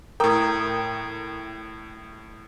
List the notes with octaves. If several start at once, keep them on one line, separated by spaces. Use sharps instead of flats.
A2 A#4 G5 A#5 D#6